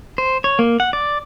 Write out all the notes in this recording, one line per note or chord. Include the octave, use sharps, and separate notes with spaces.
C5
C#5
A#3
F#5
D5